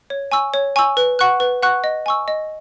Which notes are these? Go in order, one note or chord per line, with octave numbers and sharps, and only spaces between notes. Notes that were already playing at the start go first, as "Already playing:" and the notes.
C#5
G#5 C#6 E6
C#5
G#5 C#6 E6
B4
F#5 C#6 F#6
B4
F#5 C#6 F#6
D#5
G#5 C#6 E6
D#5